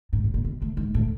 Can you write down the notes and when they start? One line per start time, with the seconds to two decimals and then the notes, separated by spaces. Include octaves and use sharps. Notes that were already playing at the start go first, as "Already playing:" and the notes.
0.13 G#2
0.24 A2
0.34 A#2
0.45 B2
0.62 A2
0.77 G#2
0.94 A2